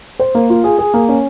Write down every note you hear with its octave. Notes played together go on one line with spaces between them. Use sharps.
C5
A#3
F4
G#4
G#4
A#3
C#4